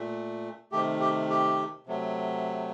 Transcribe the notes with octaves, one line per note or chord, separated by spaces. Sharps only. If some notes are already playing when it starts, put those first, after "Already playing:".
Already playing: A#2 A3
C3 D#3 A3 G4
G4
G4
C3 F#3 A3